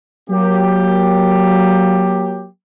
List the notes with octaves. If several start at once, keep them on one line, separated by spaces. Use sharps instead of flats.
F#3 A#3 G4